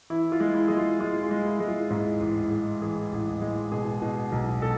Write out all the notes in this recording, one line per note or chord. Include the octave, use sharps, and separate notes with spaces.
E3 E4
F4
G#3
E4
G#3 G#4
F4
G#3 F4
F4
G#3
E4
G#3
F4
G#2
A1
G#3
E3 G#4
A1
G#3
B2 G#4
B2
B1
B2 A4